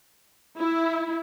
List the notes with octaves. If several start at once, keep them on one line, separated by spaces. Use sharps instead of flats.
E4